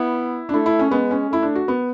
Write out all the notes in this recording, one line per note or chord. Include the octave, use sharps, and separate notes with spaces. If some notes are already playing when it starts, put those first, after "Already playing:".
Already playing: B3 E4
D4
A3 E4
E4
C#4
G#3 B3
C#4
A3 E4
D4
F#4
B3